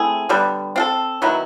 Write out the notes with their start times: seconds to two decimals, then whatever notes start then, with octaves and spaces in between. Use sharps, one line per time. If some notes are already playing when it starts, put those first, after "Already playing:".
Already playing: A3 C4 E4 G#4
0.29 D3 G3 B3
0.76 C4 F4 A4
1.22 D#3 F#3 B3 E4